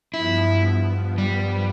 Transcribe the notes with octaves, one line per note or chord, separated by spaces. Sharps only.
G2 F3 B3 E4
G3